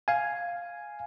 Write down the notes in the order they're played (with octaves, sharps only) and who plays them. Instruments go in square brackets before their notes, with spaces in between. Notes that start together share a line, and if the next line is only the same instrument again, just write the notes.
[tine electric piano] F5 G#5